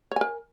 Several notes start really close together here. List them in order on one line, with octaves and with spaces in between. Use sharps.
C#5 G#5 A#4